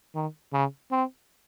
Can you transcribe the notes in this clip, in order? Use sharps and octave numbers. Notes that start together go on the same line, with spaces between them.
D#3
C#3
C4